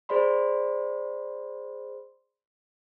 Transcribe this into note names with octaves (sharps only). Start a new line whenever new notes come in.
G#4 C5 D5 B5 C6